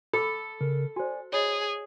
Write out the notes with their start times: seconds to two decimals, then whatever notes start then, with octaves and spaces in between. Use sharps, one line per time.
0.13 A4 B5 D6 E6
0.61 C#3 A#4
0.96 F#4 C5 D5 G#5
1.33 G#4 C#5 D#5 B5